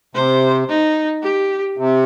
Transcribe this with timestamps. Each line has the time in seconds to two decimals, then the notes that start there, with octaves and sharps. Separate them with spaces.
0.15 C3 C5
0.68 D#4
1.23 G4
1.77 C3